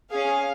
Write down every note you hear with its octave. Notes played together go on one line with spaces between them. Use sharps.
C#4 G#4 F5